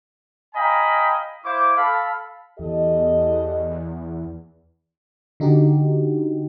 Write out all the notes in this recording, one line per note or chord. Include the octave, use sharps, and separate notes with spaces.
D#5 F5 G5 G#5 A#5 B5
E4 C5 F5 D6
A4 F5 B5
E2 G4 A4 D#5
D3 D#4 F#4 G4